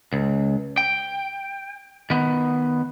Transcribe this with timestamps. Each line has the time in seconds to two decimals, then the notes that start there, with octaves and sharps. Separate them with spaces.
0.13 C#2
0.77 G5
2.10 D#3 B3